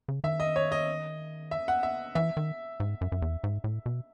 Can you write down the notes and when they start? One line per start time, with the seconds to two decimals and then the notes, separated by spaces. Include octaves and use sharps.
0.08 C#3
0.24 D#3 E5
0.40 D#5
0.56 C#5
0.72 D#5
1.51 E5
1.68 F#5
1.83 E5
2.15 E3 E5
2.37 D#3
2.80 G#2
3.01 F#2
3.12 F#2
3.22 E2
3.44 G#2
3.64 A2
3.86 B2